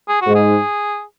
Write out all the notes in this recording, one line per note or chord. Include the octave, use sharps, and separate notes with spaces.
G#4
G#2 F#4
G#4